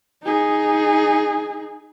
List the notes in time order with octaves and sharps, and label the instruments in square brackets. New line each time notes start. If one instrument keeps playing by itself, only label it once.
[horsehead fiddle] D#4 G#4